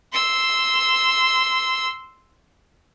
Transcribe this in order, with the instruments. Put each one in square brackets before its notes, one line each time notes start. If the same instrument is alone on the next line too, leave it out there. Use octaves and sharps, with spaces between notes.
[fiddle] C6 E6